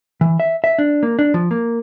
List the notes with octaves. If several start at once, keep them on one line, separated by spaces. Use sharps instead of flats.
E3
E5
E5
D4
A#3
D4
F3
A#3